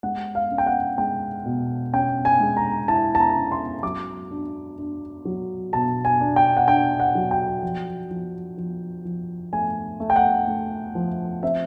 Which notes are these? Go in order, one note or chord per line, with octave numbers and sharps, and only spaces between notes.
G#3 F#5
F5
C#4
G5
F#5
G#3 G5
B2
C#4 G5
G#5
G#3
A#5
E4 A5
A5
A#5
C#4
C6
F#3 D6
D4
D4
F#3
B2 A5
G#5
D4
G5
F#5
D4 G5
F#5
F#3
G5
F3
F3
F3
F3
A3 G#5
A3
G5
F#5
A3
F3
C4 E5